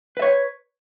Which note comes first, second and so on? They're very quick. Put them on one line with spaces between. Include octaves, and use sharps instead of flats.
B4 E5 C#5